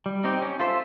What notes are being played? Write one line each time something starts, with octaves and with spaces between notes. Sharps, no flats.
G3
C4 D#4 G4
C#4
F4 A4 C5 E5